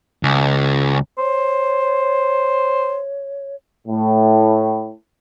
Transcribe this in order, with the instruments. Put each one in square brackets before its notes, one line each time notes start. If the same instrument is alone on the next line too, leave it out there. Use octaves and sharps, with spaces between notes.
[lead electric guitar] C#2
[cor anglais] C5 [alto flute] C#5
[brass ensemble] A2